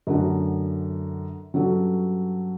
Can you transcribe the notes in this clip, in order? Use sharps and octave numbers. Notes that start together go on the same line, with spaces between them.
F#2 D3 A3 D4 F#4
G2 F#3 C#4 F#4 A4